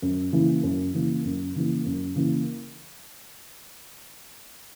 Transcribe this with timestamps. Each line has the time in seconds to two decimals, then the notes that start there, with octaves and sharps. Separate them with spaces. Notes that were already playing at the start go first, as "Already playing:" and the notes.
0.02 F#2
0.33 C#3 E3 A#3
0.63 F#2
0.94 C#3 E3 A#3
1.25 F#2
1.56 C#3 E3 A#3
1.86 F#2
2.15 C#3 E3 A#3